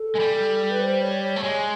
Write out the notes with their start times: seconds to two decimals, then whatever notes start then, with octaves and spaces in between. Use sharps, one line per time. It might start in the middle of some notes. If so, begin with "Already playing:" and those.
Already playing: A4
0.15 G#3
0.20 G3
0.70 B4
0.81 C5
1.02 C#5
1.23 C#5
1.36 A3
1.43 G#3 C#5